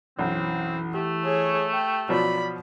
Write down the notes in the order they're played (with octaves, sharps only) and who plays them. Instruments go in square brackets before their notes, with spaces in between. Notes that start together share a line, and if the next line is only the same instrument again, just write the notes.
[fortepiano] B1 F#2 [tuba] E3 [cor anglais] C4
[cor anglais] A3 [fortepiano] G4
[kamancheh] G#4 C#5
G5
[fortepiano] B2 F3 F#3 [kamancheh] D5 B5